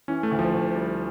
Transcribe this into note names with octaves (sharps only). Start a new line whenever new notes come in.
E3 C#4
A3
D2
F3
D2
G3